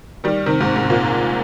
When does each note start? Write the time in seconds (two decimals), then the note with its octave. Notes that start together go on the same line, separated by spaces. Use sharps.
0.24 D#3 G3
0.46 C3 D#3
0.61 G#2 C3
0.76 G#2
0.83 C3
0.90 A#2